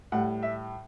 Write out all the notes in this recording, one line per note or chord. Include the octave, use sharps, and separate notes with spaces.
A2 G3 F#5
E5